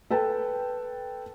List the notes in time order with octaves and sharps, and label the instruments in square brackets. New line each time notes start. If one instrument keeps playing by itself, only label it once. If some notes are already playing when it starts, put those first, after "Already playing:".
[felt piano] A4 B4 G5 A5